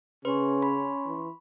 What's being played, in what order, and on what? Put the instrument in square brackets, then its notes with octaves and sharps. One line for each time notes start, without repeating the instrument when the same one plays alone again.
[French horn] C#3 [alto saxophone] C#4 [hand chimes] B4 [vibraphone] C6 C#6
[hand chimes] B5
[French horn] E3